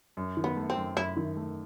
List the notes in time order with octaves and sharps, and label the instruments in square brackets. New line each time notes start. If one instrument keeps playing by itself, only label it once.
[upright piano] F#2
D#3
[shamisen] B3
[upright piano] A3
[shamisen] C4
[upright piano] F#2
[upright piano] F#2 [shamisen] E4
[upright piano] D#3
A3